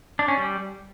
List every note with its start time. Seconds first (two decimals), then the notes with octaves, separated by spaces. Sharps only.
0.19 D4
0.28 C#4
0.37 G3